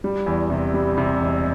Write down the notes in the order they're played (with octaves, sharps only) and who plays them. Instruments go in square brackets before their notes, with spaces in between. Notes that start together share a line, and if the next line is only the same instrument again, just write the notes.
[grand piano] G3
E2
C3
G3
C3
E1